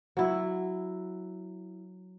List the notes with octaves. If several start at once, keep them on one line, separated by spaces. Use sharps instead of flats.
F#3 E4